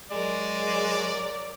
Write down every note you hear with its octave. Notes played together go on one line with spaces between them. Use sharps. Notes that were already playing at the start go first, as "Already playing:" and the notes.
F#3 G#3 A#4 C#5 D5